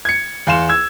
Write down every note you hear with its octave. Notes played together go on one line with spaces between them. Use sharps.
G#6 C#7
E2 F5 C6 E7
E6 G#6